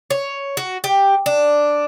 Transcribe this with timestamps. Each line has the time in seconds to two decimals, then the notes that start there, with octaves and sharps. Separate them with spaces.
0.10 C#5
0.57 F#4
0.84 G4
1.26 D4